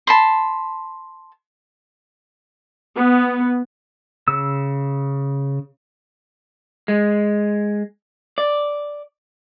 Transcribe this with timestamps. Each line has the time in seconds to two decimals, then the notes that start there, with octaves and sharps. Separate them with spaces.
0.07 A5 B5 C6
2.96 B3
4.28 C#3 E6
6.88 G#3
8.38 D5